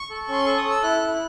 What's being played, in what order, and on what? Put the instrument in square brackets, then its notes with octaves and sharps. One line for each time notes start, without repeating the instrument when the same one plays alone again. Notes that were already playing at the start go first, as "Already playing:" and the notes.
Already playing: [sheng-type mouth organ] C#6
A4
C#4 C6
A4 C#6
D#6
A4
E6
E4 F#6
E4